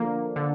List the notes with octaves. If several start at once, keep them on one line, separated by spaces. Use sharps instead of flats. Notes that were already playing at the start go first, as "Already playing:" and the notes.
Already playing: D3 F3 A#3
D3